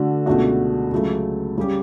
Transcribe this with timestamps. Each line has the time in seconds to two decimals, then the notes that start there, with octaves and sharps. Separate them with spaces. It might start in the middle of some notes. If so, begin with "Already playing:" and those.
Already playing: D3 A3 D4 F#4
0.26 C#2 B2 A3 D4 F#4
0.91 C#2 C#3 F#3 A3
1.57 C#3 G3 C#4 G4